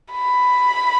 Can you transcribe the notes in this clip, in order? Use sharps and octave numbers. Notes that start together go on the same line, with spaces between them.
B5